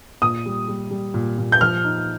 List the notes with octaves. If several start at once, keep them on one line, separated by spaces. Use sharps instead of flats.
A#2 D#6
G3
G3
G3
A#2
A#2
G6
F3 F6
D#4